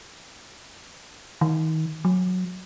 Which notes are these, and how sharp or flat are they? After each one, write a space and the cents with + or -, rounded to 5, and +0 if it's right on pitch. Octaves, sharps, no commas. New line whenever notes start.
D#3 +30
F#3 -15